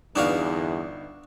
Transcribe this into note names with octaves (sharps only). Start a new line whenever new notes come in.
G1 E2 D4 D#4 F#4 F5 D#6